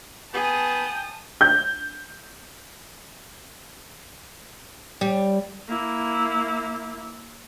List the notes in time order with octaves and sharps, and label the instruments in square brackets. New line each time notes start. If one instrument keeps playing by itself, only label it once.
[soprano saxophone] B3 [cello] G#4 [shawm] G5 [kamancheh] A5 D#6
[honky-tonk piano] G6
[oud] G3
[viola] A#3 E4